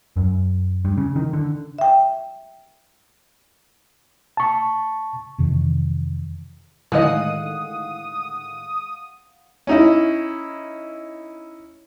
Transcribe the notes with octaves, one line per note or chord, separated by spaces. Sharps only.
F#2
G2
C#3
D#3
D3
E5 G5
A5 C#6
F2 C3 D#3 E3
A2 D3 D#3 G#3 D#5 F5 F#5 D#6
C#4 D#4 E4